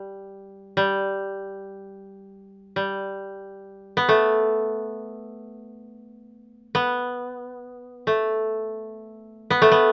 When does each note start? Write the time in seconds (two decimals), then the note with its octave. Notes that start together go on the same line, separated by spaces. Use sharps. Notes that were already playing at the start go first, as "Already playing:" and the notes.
Already playing: G3
0.77 G3
2.76 G3
3.97 B3
4.09 A3
6.75 B3
8.07 A3
9.50 B3
9.62 A3
9.72 B3